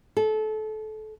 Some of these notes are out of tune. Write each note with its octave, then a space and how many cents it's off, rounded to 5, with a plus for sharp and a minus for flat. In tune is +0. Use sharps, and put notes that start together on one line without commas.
A4 -25